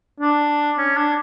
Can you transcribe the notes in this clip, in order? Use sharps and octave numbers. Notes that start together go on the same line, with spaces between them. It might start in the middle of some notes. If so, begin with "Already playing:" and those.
D4
C#4
D4